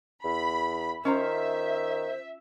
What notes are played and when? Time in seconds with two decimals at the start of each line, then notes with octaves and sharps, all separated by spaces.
0.24 E2 B5
1.05 D#3 C#4 F4 C5 E5 A#5